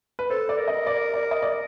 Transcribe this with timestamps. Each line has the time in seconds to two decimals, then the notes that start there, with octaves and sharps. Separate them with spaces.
0.19 B4
0.30 A4 C5
0.49 D5
0.58 A#4
0.68 D#5
0.87 D5
1.14 D5
1.31 D#5
1.42 D5